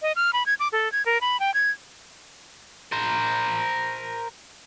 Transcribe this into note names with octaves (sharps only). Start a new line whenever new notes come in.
D#5
F6
B5
G#6
D6
A4
G#6
A#4
B5
G5
G#6
A#4 C5